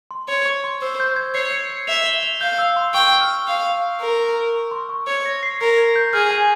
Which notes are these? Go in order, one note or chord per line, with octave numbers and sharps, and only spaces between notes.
C6
C#5 C6
C#6
C6
C5 E6
G6
G#6
C#5 C7
C#7
C#7
E5 F7
G7
F7
F5 G6
E6
C6
G5 C#6
F6
F5
A#4
C#6
C6
C#6
C#5
G#6
A#6
C7
A#4 A#6
G#6
G6
G#4 F6
G#5